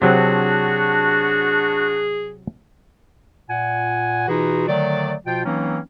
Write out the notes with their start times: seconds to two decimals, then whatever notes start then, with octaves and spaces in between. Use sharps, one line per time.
0.02 C3 F#3 C4 D4 F#4 G#4
3.48 A#2 F#5 G#5
4.28 B2 E3 D#4 F4 F#4 G#4
4.67 D3 D#3 F#3 A3 D5
5.26 B2 F3 F4 G5
5.44 E3 F#3 A#3 C4 C#4 D#4